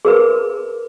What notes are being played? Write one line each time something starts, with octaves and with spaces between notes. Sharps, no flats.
G#4 A#4 B4